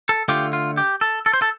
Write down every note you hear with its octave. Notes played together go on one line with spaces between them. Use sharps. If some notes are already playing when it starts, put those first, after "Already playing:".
A4
D3 A3 F4 G4
F4
G4
A4
A4
C5
A4